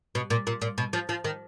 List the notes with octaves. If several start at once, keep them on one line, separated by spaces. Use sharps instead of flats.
B2
A#2
A#2
A#2
B2
F3
F3
D#3